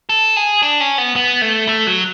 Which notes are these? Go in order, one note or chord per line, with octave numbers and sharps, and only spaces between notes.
A4
G#4
D4
C#4
B3
B3
A3
A3
F#3